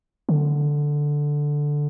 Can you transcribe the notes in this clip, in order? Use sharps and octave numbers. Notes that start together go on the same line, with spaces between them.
D3